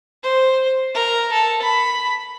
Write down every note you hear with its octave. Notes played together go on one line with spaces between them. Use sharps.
C5
A#4
A4
B5